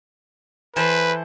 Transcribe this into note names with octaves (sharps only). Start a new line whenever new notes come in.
E3 A4 B4 C5